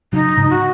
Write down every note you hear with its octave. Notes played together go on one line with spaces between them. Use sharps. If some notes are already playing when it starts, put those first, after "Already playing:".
C#3 F#3 D#4
G#2 C#3
F#4